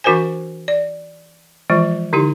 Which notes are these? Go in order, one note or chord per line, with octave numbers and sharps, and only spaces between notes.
E3 D4 F#4 A#4 C5 G#5
D5
E3 F3 G#3 F4
D3 D#4 E4 G4